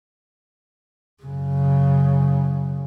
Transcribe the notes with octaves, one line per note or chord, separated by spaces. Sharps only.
F#2 C#3